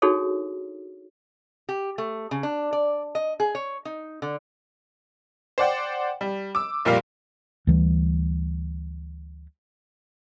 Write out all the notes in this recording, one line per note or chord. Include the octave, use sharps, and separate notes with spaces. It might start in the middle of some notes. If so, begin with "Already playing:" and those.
D4 D#4 F#4 G#4 A4 C#5
G4
A3
C#3
D4
D5
D#5
G#4
C#5
D#4
D3
C5 D5 F#5 G5
G3
D6 E6
F1 A#2 G3 F5
D2 E3 G3